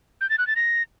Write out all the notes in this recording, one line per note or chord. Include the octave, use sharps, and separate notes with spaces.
G6
A6
F#6
A6
A#6